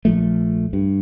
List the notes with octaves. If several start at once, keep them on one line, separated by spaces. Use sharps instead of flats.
A#1 F3 A3
G2